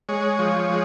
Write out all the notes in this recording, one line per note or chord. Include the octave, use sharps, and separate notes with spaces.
G#3 C#5
F3
G#3